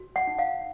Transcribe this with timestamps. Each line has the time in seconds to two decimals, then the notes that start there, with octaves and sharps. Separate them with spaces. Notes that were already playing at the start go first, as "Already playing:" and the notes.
Already playing: F#4
0.16 F#5
0.27 D#4
0.39 F5